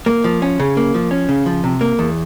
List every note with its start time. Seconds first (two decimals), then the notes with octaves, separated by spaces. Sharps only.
0.06 A#3
0.24 F3
0.42 C#4
0.60 C#3
0.77 A#3
0.95 F3
1.11 C#4
1.29 C#3
1.46 F3
1.64 C3
1.81 A#3
1.99 E2